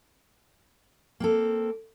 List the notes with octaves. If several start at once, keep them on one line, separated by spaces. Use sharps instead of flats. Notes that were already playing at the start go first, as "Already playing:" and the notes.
A#3 C4 A4